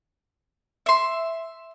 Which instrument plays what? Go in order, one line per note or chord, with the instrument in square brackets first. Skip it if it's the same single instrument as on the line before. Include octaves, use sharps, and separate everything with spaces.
[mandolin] E5 C6